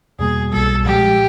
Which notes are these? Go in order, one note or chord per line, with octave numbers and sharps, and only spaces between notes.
E2 B2 G3 A#3 G#4
B1 B2 G3 A4
A#2 F3 G#3 G4